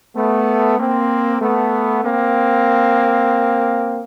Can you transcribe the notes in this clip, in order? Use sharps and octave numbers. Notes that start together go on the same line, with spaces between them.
A3 B3
A#3 C4
A3 B3
A#3 C4